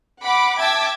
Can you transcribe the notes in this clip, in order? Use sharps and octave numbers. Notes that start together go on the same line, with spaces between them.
F#5 B5 D6
E5 G5 A5 D6 E6 G#6